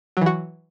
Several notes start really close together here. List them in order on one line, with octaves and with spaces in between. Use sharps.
F#3 E3 F#4